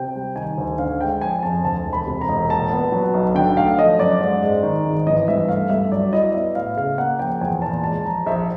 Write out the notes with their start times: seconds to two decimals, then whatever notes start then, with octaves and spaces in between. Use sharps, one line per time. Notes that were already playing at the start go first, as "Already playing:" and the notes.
Already playing: C3 G5
0.15 G3
0.36 D#3 G#5
0.58 D2
0.78 D3 F5
1.01 G#3 G5
1.21 F3 G#5
1.43 F2 A5
1.64 D2 A5
1.86 E1
1.93 B5
2.07 C3
2.21 A#5
2.29 E1
2.50 A#2 A5
2.71 B3
2.92 F#3
3.14 B1
3.35 D3 G5
3.57 A3 F5
3.77 F3 D#5
3.99 F#2 D5
4.20 G#2
4.43 G#3
4.63 D#3
4.85 G#1
5.07 E3 D#5
5.28 G2 E5
5.48 A3 F5
5.70 G2 E5
5.92 F#3 D5
6.13 E4 D#5
6.34 B3 E5
6.55 A2 F5
6.76 C#3 F5
6.98 A#3 F#5
7.19 F3 G5
7.41 E2 G#5
7.62 A#2 A5
7.84 G#3 A5
8.05 F3 A#5
8.26 A#1 E5